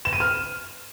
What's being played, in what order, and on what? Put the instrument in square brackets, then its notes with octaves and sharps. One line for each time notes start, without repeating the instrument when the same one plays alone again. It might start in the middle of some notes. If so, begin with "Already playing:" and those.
[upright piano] E7
D#7
F6